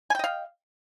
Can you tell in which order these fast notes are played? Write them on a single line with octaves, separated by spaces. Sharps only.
G#5 G5 D#5 F5